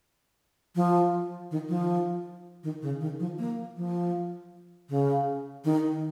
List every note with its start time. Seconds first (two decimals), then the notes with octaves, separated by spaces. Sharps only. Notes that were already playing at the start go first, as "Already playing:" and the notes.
0.76 F3
1.51 D#3
1.69 F3
2.64 D#3
2.82 C#3
3.01 D#3
3.19 F3
3.39 A#3
3.77 F3
4.89 C#3
5.65 D#3